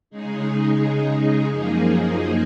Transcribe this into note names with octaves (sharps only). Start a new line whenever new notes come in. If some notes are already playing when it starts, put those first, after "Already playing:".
C#3 G#3 D#4 G#4
F#2 F3 A#3 D#4 G#4